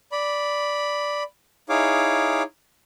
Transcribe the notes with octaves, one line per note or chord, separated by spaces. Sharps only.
D5 B5
D#4 E4 G#4 C#5 F5 D6